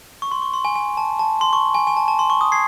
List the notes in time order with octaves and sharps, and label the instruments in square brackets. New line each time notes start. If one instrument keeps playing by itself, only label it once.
[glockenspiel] C#6
C6
C#6
C6
G#5
G#5
A5
A5
C6
C#6
G#5
G#5
A5
A5
C6
C#6
D#6
G#6 C7